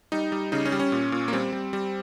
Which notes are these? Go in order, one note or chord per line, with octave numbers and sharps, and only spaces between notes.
G3 D#4
G3
C#3 D#4
C#4
G3
C#4
A#2
A#2
A#3
G3 C4
G3
G3